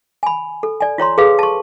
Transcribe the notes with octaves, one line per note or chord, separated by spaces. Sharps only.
G#5 B5
A4
D5 G#5
F4 C#5 A#5 C6
G#4 A4 B4 F5
A5 C#6